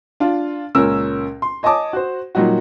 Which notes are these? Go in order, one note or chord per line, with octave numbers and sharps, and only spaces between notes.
D4 F4
C#2 A#2 C#4 A#4 E6
C6
C#5 D#5 G#5 A5 D6 D#6
F#4 C5
A#2 F#3 G3 D#4 F#4